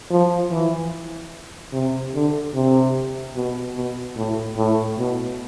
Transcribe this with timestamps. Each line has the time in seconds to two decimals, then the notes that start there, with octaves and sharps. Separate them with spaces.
0.10 F3
0.51 E3
1.73 C3
2.14 D3
2.54 C3
3.36 B2
3.76 B2
4.16 A2
4.57 A2
4.98 B2